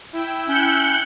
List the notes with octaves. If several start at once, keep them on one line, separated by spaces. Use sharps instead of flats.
E4 G5 E6
C#4 F#6 G6 C#7